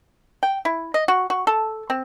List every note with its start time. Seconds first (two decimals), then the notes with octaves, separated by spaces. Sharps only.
0.43 G5
0.65 E4
0.94 D#5
1.08 F#4
1.30 F#4
1.47 A4
1.90 C4